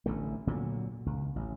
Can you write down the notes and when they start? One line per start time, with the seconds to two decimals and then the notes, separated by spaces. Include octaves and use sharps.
0.06 A1 D3 A3
0.47 A#2 D3 F3 F#3
1.06 C#2
1.36 A1